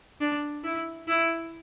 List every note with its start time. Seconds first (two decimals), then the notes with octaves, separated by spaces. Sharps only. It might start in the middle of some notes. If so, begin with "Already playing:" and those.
0.20 D4
0.64 E4
1.08 E4